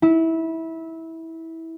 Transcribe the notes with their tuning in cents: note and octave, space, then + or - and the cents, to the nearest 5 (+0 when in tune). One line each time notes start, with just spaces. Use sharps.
E4 -20